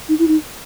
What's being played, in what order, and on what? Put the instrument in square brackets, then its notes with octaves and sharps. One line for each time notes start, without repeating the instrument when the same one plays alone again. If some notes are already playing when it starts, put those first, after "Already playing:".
[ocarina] D#4
E4
D#4